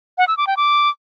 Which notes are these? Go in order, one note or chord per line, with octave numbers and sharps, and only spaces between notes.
F#5
E6
D6
G5
D6